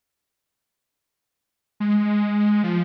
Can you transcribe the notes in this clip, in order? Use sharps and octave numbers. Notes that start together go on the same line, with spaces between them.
G#3
F3